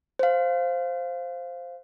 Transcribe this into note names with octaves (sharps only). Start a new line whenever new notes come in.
C5 F5